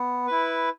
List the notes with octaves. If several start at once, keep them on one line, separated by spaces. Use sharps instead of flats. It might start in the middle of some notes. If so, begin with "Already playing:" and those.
Already playing: B3
E4 B4